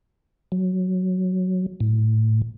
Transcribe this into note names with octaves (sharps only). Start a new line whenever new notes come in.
F#3
A2